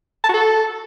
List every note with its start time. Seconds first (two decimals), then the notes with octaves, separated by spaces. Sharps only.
0.24 A5
0.29 F#4
0.34 A4